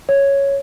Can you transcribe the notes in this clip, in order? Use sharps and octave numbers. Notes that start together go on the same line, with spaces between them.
C#5